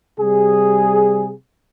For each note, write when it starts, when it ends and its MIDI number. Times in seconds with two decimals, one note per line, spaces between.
0.18 1.31 48
0.18 1.31 55
0.18 1.31 68